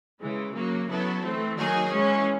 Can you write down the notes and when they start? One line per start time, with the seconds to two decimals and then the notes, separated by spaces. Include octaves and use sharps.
0.19 C#3 E3 G#3
0.54 C#3 F#3 A#3
0.88 C#3 F#3 B3 E4 A4
1.22 E3 A3 C4
1.57 D#3 F#3 A#3 D#4 G#4
1.90 E3 G#3 C#4